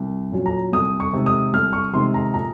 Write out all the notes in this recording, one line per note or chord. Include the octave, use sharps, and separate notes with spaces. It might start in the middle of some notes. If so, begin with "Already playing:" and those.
Already playing: C2
A#2 F#3 C#4
A#5
C2 D#6
C#6
C3 D#3 G#3
D#6
C2 F6
C#6
C3 D#3 G#3 C6
A#5
A#2 A#5